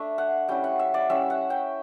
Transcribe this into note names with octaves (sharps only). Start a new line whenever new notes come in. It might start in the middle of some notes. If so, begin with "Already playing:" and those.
Already playing: A3 D4 E5
F#5
G3 C#4 E4 G5
F#5
E5
D5
G3 C#4 E4 E5
F#5
G5